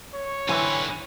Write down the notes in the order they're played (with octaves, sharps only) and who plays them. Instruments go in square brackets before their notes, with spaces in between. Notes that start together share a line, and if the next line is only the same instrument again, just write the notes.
[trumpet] C#5
[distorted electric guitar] D3 B4 [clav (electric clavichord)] E3 C4 E4 [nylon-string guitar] G#5